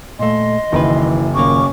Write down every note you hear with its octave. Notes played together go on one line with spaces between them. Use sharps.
A#2 A3 D#5 C6
F#1 D#3 E3 A#4 B4
D#2 A#2 A#3 C#4 C#6 D6